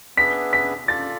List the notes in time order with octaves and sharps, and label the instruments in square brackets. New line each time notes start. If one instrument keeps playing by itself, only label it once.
[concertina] B3 D4 G#4 B4 E5 [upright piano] B6
[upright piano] B6
[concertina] F4 A4 D5 [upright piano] A6